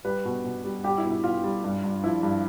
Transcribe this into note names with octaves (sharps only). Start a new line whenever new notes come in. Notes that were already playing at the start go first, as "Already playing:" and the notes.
G3 B4
B2
B2
G3
G3 G4
E4
B2
E4
B2 F4
G3
G2
G2
F3 E4
G2